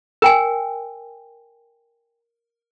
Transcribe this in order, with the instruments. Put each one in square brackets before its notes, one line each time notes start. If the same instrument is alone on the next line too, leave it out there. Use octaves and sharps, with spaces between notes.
[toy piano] A#4 G5 G#5